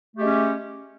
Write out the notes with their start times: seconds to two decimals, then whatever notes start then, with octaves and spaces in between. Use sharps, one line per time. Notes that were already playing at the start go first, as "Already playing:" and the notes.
0.15 A3
0.18 G4
0.21 G#3
0.24 C#4